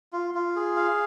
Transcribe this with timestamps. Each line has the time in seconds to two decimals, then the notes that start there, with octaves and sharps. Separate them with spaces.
0.13 F4
0.34 F4
0.56 G#4
0.77 F5